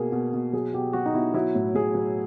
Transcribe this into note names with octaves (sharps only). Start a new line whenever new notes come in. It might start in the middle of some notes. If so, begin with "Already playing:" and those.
Already playing: B2 A#3 G#4
B2
B2
F#3 G#4
B2 G4
F#3 F#4
D#4
B2 E4
F#3 E4
A2
A2 G#4
F#3